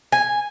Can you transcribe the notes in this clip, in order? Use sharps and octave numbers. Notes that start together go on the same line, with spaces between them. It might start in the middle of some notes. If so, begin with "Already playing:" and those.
G#5